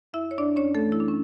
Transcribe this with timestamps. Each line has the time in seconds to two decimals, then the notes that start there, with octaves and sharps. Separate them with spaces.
0.13 F#2 E4 E5
0.31 C#5
0.38 F#2 D4 D5
0.56 C#4 C#5
0.62 F#2
0.74 A3 A4
0.86 E3
0.92 E4
1.00 D4
1.08 C#4